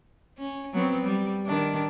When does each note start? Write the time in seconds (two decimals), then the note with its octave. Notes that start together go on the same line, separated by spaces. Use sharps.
0.38 C#4
0.74 F#3 B3 C4
1.05 G3
1.46 D#3 D4